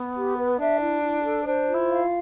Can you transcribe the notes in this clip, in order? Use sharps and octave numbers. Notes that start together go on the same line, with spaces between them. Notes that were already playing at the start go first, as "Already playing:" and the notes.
Already playing: B3
G4
B4
D4 E5
E4
E4
A4
D4 C5
F4
E4
F5